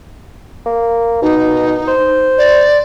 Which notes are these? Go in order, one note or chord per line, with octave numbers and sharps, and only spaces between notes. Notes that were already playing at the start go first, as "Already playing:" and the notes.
A#3
B2 D#4
C5
D5